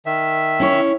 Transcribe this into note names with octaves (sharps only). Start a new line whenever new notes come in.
D#3 E5
C#4 E4 C#5